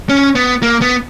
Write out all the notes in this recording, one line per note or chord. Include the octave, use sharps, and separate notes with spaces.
C#4
B3
A#3
B3